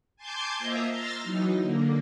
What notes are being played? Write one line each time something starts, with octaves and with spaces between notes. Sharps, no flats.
G#5 A5 C6 D6 G6 G#6
A#3 F4 C5 D#5 E5 A#5
A#5 C6 E6 F6 A6 A#6
E3 F#3 D#4
D3 A#3